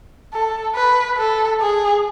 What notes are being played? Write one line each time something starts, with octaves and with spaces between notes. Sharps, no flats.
A4
B4
A4
G#4